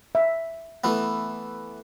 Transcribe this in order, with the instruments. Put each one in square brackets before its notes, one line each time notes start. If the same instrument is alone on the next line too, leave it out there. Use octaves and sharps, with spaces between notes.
[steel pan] E5
[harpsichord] E3 A3 B3